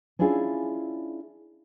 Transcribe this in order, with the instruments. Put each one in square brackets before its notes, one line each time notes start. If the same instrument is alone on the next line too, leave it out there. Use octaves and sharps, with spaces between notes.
[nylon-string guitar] C#4 D4 E4 F4 G#4